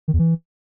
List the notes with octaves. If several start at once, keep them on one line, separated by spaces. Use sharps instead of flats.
D#3
E2
E3